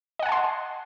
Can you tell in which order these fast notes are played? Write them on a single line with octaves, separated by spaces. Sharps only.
D#5 F#5 G#5 A5 C6